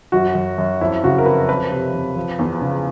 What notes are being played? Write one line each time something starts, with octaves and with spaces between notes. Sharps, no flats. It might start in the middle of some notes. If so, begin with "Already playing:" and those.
F#2 F#4
F#2
F#2
F2 E4
C#3 F#4
A#4
F2 B4
F2 B4
C3
F2
F3
E2
C#3